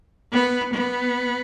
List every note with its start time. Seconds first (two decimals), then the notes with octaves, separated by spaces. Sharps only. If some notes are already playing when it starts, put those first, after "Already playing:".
0.33 B3
0.74 B3